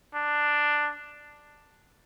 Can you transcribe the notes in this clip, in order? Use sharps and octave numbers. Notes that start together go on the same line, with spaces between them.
D4